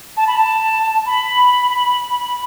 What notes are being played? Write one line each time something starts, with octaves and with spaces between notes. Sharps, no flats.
A5
B5
A5
B5